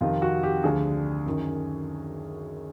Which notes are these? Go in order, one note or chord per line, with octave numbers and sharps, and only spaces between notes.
F2 C3 D#3 F4
F#4
G4
D2 D3 F3 G#4
F#2 D#3